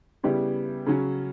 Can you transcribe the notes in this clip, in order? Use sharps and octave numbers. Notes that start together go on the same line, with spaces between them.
C#3 G3 B3 E4 G4
C#3 F#3 C#4